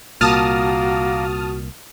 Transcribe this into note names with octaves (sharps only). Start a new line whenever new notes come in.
C2 A#2 A#3 F#4 A5 D#6 F6